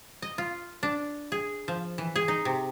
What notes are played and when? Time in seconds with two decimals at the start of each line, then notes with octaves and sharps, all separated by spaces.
0.22 D#5
0.38 F4
0.83 D4
1.32 G#4
1.68 F3
1.98 E3
2.16 G#4
2.28 D#4
2.45 C3